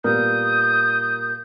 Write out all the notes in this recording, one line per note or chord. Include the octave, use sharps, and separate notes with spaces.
A#2 G3 B3 A#4 D#6 G6